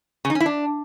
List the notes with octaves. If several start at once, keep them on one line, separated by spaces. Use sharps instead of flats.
C#3
D#4
C#4
E4
D4